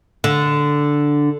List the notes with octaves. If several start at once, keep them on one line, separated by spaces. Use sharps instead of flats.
D3